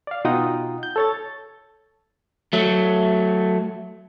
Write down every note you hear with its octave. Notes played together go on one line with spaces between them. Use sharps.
D5 F5
B2 D#4 F4 F#5 G5 D#6
G6
A4 C#5 A6
F#3 A3